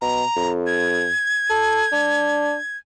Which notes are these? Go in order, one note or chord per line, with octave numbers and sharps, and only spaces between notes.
B2 A#5
F2
G#6
A4
D4